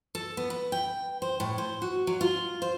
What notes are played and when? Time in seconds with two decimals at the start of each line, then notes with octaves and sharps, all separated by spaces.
0.15 A4
0.37 B3
0.50 B4
0.72 G5
1.22 C5
1.40 A2
1.58 C5
1.82 F#4
2.07 F#3
2.21 F4
2.62 C5